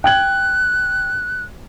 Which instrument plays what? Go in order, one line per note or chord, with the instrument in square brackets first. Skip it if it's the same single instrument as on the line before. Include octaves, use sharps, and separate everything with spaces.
[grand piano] G5 G#6 F#7 [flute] F#6